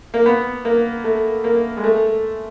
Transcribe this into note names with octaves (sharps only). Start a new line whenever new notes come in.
A#3
B3
A#3
A3
A#3
G#3
A3